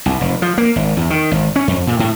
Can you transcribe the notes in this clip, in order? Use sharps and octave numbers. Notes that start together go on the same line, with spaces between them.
C2
F1
F3
A#3
G#1
E2
D#3
G#1
C#4
F2
A#2
A2